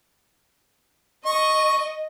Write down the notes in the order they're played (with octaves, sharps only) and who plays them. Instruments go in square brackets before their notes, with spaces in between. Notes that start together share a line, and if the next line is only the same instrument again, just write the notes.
[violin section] D#5 [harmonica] C#6